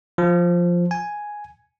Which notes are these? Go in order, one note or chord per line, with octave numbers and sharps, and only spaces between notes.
F3
G#5